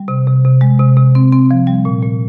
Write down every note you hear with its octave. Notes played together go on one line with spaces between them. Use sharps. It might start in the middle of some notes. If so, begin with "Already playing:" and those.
Already playing: G3
C3
C3
C3
G#3
C3
C3
C4
C4
F3
G3
A#2
A#2